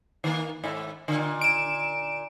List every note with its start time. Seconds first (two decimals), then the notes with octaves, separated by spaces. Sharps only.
0.24 D#3 A#3
0.64 G#2 E5
1.08 A#2 D3
1.41 D7 E7